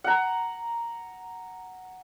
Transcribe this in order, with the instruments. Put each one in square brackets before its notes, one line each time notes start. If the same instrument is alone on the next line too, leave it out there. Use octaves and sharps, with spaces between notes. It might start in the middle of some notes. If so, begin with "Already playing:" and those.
[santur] F#5 A#5